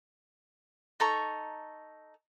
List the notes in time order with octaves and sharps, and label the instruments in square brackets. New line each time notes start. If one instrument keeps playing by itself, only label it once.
[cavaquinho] D#4 A4 A#5 C#6